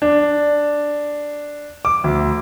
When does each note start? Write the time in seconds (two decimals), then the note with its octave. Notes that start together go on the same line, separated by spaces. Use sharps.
0.02 D4
1.85 D6
2.04 D2